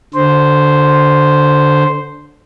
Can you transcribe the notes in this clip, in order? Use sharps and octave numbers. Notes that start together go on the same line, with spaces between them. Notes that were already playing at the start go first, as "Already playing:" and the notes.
D3 C5